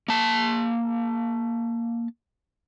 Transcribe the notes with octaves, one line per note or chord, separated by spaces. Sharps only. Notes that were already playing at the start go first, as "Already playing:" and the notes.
A#3 A5